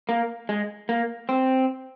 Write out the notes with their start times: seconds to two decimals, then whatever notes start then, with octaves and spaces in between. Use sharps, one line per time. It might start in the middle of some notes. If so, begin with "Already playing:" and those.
0.09 A#3
0.49 G#3
0.89 A#3
1.29 C4